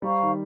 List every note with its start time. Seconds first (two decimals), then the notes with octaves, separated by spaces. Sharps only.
0.02 G3 C5 F5 A#5 C#6
0.23 D#3